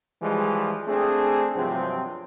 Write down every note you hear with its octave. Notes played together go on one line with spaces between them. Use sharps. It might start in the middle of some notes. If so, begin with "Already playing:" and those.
E3 F3 G3 G#3
A3 C4 D4 G#4
G2 C3 F3 F#3 C4 D4